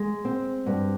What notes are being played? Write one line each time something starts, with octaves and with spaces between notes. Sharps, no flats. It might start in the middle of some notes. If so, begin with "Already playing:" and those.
Already playing: G#3
C4
G2